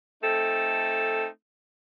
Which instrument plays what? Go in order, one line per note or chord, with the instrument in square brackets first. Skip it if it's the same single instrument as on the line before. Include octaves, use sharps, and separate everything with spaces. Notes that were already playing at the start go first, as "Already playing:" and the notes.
[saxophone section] A3 C4 D#4 A4